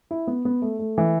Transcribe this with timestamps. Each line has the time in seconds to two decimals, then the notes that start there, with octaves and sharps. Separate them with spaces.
0.11 E4
0.27 B3
0.45 B3
0.62 A3
0.79 A3
0.98 E3